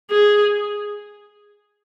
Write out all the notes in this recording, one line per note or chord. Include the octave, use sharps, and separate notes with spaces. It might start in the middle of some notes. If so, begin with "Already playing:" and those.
G#4